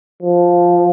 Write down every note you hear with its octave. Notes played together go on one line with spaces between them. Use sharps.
F3